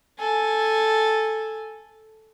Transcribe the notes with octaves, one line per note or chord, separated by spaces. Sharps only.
A4 G#5